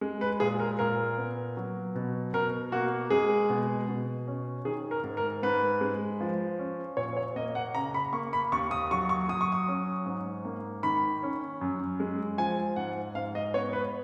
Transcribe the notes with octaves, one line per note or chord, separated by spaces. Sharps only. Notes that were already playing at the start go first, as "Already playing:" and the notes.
G#3
B4
A#2 G#4
A#4
A#2 A#4
B3
F#3
B2
B2 A#4
A#3 F#4
G#3 G#4
B2
B2
C#4
D#3 G#4
A#4
G#2
A#4
G#2 B4
G#3
F3
C#4
A#2 C#5
C#5
A#3 D#5
F#5
C#3 A#5
B5
A#3 C#6
B5
D#2 C#6
D#6
F#3 C#6
C#6
F#3 D#6
C#6
D#6
C#4
G#2
A#3
D#3 B5
C#4
F#2
G#3
F3 G#5
G#2 F#5
G#2 F5
D#5
B3 C#5
B4